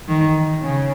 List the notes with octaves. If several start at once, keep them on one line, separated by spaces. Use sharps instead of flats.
D#3
C#3